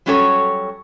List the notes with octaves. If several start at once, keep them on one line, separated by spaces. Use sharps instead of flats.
F#3 G3 C#4 F#4 A4 C#5